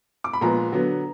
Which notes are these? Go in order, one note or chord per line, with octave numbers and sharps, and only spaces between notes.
D6
B5
A#2 F3 G#3 B3 A#5
D3 F#3 B3